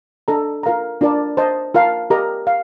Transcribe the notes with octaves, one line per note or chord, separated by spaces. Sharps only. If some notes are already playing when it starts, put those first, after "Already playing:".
D4 A4 D#5 A#5
F4 A#4 F5 A#5
D4 F4 A#4 D5 A5
C5 D#5 A5
F4 A#4 F5 A5
G4 A#4 D#5 A#5
F5